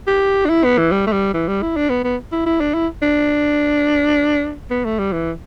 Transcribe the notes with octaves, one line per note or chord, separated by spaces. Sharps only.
G4
D4
E4
B3
E3
G3
A3
G3
E3
G3
E4
D4
B3
B3
E4
E4
D4
E4
D4
B3
A3
G3
E3